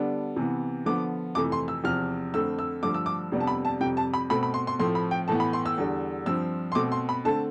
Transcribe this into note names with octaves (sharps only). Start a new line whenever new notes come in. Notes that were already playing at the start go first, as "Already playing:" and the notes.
Already playing: D3 G3 B3 D4
C3 E3 B3
D3 F3 B3 D6
F2 C3 E3 A3 D6
C6
E6
E2 C3 F3 F6
F2 D3 A3 C4 E6
E6
G2 D3 F3 A3 D6
E6
D6
F2 C3 G3 B3 D4
A5
B5
A5
F2 C3 G3 G5
A5
B5
B2 A3 C4 B5
B5
C6
C6
A2 F3 A3 C4 C6
B5
G5
A2 E3 B3 A5
B5
C6
E6
E2 D3 G3
G2 F3 C4 E6
C6
B2 A3 C4 D6
C6
B5
D3 A3 C4 A5